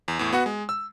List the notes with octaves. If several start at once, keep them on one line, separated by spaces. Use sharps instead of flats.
E2
E2 A2
B3 F#4 F#5
G#3
E6